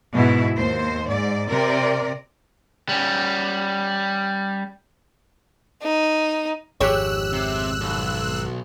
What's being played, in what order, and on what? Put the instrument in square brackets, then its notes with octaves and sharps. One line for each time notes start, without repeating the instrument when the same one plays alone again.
[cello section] G#2 B2 E4
D#2 C5
G#2 D5
C3 A#4 D5
[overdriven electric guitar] G3 C#4
[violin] D#4
[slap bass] G#1 F2 G#2 [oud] G4 G#4 C#5 [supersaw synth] E6 F#6
[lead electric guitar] C3
B1